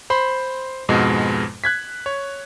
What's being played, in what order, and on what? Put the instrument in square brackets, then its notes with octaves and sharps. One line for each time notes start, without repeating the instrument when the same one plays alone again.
[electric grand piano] C5 B5 C6
F2 G#2 B2 G#3
F#6 G#6 B6
C#5